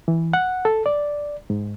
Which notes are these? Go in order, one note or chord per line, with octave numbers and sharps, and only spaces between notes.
E3
F#5
A4
D5
G#2